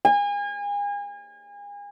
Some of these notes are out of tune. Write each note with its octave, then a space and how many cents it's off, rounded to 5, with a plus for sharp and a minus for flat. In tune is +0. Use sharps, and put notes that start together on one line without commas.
G#5 -35